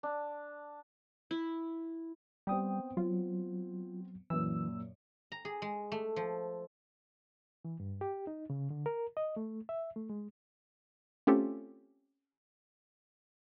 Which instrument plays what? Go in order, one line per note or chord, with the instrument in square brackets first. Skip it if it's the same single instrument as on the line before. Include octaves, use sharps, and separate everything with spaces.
[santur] D4
[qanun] E4
[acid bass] G3 [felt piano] B3 C4 [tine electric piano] G5 D#6
[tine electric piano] F#3 [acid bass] F4
[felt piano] F#2 A#2 [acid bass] E3 [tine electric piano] E6
[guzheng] A#5
G#4
G#3
A3
F3
[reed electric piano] E3
G2
G4
D#4
C#3
D3
A#4
D#5
A3
E5
A3
G#3
[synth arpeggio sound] A3 C4 C#4 F4 G4 A4